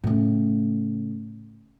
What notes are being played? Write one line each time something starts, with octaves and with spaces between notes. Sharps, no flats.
A2 C#3